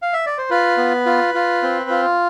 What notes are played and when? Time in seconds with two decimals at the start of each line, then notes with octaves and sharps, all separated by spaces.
0.02 F5
0.13 E5
0.26 D5
0.38 C5
0.50 F4 B4
0.77 B3
1.06 F4
1.35 F4
1.63 C4
1.90 F4